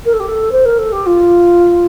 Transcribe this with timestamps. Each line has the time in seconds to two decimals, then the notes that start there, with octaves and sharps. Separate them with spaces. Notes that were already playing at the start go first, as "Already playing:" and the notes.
0.05 A#4
0.13 A4
0.20 G4
0.28 A4
0.52 C5
0.65 A#4
0.78 A4
0.92 G4
1.06 F4